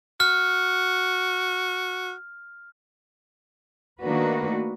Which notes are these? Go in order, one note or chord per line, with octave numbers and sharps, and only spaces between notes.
F#4 F6
D#3 A3 A#3 D4 F#4 B4